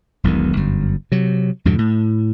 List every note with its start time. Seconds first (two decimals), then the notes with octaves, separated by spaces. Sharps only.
0.24 E1 B1 E2 D#3
0.57 G1 F#2
1.12 C3 F#3
1.65 E2 G2 B2 D3
1.78 A2